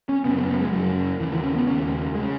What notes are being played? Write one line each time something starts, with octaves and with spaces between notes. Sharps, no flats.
C#4
F#2 C#3 B3
B3
B3
G#3
F#2 C#3 F#3
D#2 C#3 E3
E3
C#4
B3
D#2 C#3 C#4
G#3
C#3